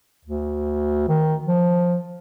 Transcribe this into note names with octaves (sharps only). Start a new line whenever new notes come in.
D2
D#3
F3